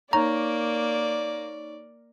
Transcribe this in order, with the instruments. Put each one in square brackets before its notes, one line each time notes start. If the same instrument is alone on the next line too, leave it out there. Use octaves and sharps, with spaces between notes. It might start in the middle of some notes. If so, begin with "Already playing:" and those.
[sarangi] A#3 [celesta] D#4 C#5 C#6 [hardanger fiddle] D5 [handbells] A#5